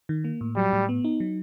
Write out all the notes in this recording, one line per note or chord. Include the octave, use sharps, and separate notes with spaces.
D#3
A#3
A2
F#3 G3
A2
B3
D#4
F#3